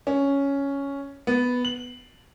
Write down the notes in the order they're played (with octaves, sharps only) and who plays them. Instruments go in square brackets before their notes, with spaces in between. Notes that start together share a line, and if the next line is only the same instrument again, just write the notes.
[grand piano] C#4
B3
F#7